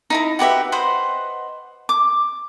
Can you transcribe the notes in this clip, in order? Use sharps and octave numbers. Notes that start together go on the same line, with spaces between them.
D#4 E4 A#5
F#4 G4 B4 E5
B4 C5 D#5 F#5
D6